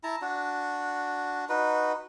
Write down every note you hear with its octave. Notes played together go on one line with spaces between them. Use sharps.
E4 A5 A#5
D4 F#4
D#4 F#4 B4